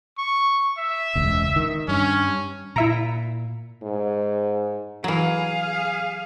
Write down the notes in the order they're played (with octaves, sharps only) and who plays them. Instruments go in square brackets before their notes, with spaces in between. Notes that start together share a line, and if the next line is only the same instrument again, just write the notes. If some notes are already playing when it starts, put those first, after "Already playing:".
[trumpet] C#6
E5
[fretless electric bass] E1 C#2
D#3
[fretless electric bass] G2 [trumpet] C#4
[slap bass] A#2 [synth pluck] E4 E5 A#5
[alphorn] G#2
[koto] E3 F#3 [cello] G#4 F5